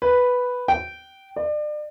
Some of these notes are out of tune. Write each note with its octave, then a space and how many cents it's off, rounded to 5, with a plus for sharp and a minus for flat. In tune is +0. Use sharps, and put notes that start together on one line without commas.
B4 +0
G5 -15
D5 +35